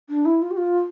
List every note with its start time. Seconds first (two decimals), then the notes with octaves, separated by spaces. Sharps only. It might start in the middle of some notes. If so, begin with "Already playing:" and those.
0.10 D4
0.25 E4
0.42 F4
0.51 G4
0.57 F4